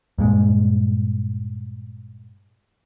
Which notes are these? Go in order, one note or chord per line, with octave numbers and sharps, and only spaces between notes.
G2 A#2 G#3